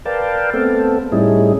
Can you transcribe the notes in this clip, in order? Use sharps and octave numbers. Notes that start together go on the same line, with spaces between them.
A#4 B4 D5 F5 G5 A5
A3 B3 C4 A4
A2 G3 C#4 D#4 E4 G#4